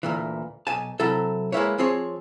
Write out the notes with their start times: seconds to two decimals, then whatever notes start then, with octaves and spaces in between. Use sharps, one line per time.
0.03 D2 A#2 E3
0.67 B1 G#5 A5
1.00 C3 F#3 E4 A4
1.52 G#3 A#3 C#4 E4 B4 C#5
1.78 F3 C4 G#4 C#5